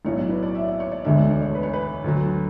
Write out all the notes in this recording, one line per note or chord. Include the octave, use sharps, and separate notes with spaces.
B1 A2 F#3 C#5
D5
B4
D5
E5
D5
C#5
D5
E1 D2 D3 G#3 D4 E5
D5
C#5
C#5
B4
C#5
B4
D2 D3 F#3